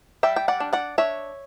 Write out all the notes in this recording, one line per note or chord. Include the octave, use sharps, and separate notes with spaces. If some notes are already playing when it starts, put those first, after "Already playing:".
G3 E5 G5
G5
D5 F#5
D4
D5 F#5
D4 C#5 E5